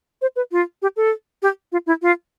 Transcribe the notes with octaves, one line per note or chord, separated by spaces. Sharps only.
C5
B4
F4
G4
A4
G4
F4
E4
F4